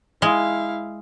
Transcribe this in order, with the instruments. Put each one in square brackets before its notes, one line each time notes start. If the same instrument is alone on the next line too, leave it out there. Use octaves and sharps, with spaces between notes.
[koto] G#3 [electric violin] E4 F5